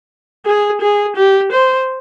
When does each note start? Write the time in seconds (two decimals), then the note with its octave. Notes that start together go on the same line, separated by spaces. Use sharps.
0.46 G#4
0.81 G#4
1.16 G4
1.52 C5